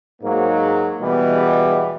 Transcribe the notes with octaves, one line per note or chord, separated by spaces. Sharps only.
G#2 F#3 A#3
E2 B2 E3 G3 G#3 B3